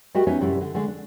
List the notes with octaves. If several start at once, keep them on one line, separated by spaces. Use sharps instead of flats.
G3 A3 F#4 G4 A#4 D#5
B3 C#4 D#4 C#5 E5
F#2 A2 C3 G3 C#4 E4
D3
D3 G#3 A3 D4
D4